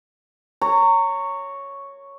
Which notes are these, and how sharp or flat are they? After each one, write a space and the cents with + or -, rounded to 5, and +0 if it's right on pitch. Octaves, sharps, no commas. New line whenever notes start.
C#5 +0 A#5 -25